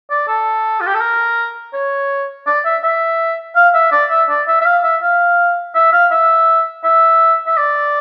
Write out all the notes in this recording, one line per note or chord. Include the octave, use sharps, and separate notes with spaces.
D5
A4
F4
G4
A4
A#4
C#5
D5
E5
E5
F5
E5
D5
E5
D5
E5
E5
F5
E5
F5
E5
F5
E5
E5
E5
D5